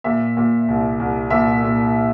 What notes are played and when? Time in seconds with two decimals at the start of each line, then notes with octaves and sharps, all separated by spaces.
0.04 A#2 E5
0.37 A#2
0.68 C2
1.00 C2
1.30 A#2 E5
1.63 A#2